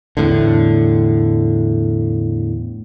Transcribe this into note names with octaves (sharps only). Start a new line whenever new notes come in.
E2 A2 D3